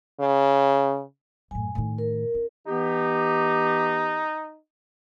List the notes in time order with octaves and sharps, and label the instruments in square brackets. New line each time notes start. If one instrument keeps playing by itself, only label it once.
[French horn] C#3
[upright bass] F#2 A2 [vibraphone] G#5
[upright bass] A2 D#3
[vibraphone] A#4
[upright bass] C#4
[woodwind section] E3 B3 G4 [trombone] D#4